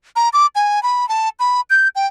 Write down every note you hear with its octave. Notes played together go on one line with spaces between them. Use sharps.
A#5
D6
G#5
B5
A5
B5
G6
G5